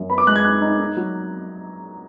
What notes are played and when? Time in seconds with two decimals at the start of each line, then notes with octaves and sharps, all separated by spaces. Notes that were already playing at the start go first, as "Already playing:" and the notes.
Already playing: F#2
0.10 B3 B5
0.18 D6
0.27 G#3 F#6
0.36 G#6
0.44 D#4 F#6
0.61 D#4
0.79 D#4
0.97 F#3